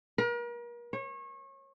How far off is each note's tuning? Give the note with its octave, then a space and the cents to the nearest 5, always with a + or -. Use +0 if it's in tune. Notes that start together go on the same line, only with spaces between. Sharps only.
A#4 +40
C#5 -30